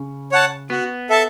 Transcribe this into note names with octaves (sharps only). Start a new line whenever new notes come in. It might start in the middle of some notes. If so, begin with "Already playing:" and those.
Already playing: C#3
C#5 F#5 A5
B3 F#4
A4 E5 A5